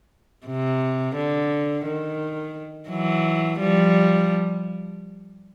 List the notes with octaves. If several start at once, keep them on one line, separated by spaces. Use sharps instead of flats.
C3
D3
D#3
E3 F#3
F3 G3